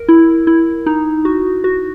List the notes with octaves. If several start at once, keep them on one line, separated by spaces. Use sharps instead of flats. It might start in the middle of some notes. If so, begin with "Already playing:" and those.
Already playing: A#4
E4
E4
D#4
F#4
F#4